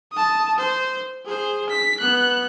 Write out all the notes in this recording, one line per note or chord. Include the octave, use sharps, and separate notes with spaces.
A5 D#6
C5
G#4 C5
B6
B3 F#6